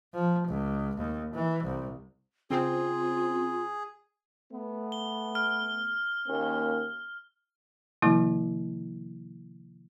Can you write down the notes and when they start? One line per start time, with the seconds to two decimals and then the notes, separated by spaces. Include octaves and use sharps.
0.14 F3
0.48 C#2
0.97 D#2
1.34 E3
1.64 C2
2.50 C#3 C4 F4 G#4
4.52 A3 B3
4.92 G7
5.35 F6
6.27 D#2 A#3 C#4
8.02 C3 D#3 F3 G3 A#3 E4